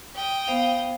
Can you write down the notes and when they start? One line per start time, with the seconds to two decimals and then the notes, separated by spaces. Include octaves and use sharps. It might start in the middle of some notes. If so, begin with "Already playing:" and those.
0.15 G5 D#6
0.48 B3 C5 F5